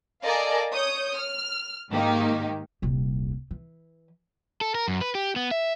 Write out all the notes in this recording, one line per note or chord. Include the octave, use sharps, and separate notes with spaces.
A4 A#4 D5 D#5 F5 G#5
C#5 D#6 G6
F6
G#2 D#3 A#3 D#4 G4
D#1 C2
E3
A4
A#4
F#2
B4
G4
B3
E5